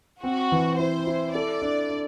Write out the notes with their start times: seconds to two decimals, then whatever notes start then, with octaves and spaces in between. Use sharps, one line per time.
0.23 C4 F#4
0.52 E3
0.78 E4 C5
1.07 E4
1.35 A4 D5
1.62 D4
1.90 D4